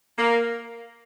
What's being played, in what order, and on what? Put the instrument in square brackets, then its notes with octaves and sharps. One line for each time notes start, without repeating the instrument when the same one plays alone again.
[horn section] A#3